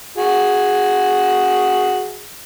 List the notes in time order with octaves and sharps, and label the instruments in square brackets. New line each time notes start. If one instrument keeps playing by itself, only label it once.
[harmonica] F#4 G#4